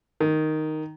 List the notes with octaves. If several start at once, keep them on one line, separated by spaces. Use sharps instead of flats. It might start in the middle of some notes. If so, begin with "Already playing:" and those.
D#3